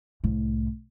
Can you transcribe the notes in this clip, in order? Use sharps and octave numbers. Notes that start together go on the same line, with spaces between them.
C2 A2